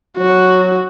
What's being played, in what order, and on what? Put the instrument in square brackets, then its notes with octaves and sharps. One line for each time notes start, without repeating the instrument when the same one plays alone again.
[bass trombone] F#3 [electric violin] F#4